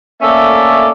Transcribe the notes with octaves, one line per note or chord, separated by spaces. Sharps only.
A3 A#3 C#4 A4 D5 E5